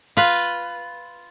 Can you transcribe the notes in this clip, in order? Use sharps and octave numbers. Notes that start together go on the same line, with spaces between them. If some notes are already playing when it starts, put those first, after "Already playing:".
F4 B4